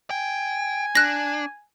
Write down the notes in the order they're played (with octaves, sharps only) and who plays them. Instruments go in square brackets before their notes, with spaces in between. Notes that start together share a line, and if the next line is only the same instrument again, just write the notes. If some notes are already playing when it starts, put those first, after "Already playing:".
[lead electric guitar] G5 [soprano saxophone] G#5
[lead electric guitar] D4 [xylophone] F#6 A#6